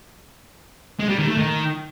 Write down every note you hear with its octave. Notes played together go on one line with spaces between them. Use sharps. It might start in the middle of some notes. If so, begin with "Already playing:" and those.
G#3
G3
D#3
A3
D#3